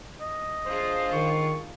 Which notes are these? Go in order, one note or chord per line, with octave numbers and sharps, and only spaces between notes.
D#5
D4 F4 G#4 C5
D#3 C#6